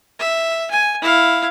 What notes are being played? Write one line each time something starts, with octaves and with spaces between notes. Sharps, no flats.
E5
G#5
E4 F5